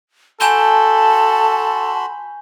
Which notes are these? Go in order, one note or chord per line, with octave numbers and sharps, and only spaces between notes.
F#4 A4 G#5 A5 B5 C6 G6 G7